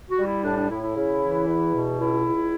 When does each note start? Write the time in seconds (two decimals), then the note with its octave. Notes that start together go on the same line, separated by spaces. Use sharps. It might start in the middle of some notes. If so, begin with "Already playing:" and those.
0.09 F#4
0.18 G3
0.26 E4
0.44 A2 D4
0.57 D4
0.69 A2 E4
0.83 E4
0.95 C#3
1.21 E3
1.47 E2
1.73 B2
1.99 C#2 E4
2.25 C#2